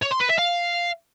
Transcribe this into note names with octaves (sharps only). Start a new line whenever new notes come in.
C#5
C6
B4
E5
F5